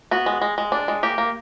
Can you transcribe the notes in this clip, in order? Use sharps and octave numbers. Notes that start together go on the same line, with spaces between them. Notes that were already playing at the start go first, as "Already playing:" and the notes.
B3 F#4
G#3
G#3
G#3
D4
G#3
A#3 G4
A#3